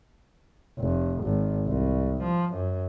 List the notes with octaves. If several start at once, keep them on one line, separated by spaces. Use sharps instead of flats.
F1
G#1
C2
F3
F#2